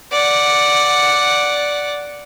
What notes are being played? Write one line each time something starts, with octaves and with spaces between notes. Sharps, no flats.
D5 F#5